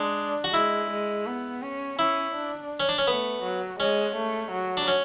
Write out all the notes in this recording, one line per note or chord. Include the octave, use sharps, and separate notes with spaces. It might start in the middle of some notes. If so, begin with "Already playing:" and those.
Already playing: G#3 D4
F#4
G#3 E4
G#3
B3
C#4
C#4 E4
D4
C#4
D4
C#4
A3 B3
F#3
G#3 C#4
A3
F#3
D4
C#4